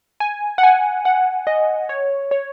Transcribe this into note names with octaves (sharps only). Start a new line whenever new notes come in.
G#5
F#5
G#5
F#5
D#5
C#5
C#5